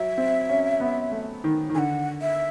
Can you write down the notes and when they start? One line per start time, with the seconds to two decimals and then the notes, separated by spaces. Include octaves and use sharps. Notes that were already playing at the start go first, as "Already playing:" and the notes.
Already playing: F#3 E5
0.18 C4
0.49 C#4
0.80 B3
1.12 A3
1.44 D#3
1.69 D#3
1.75 D3 F#5 G#5
2.22 E5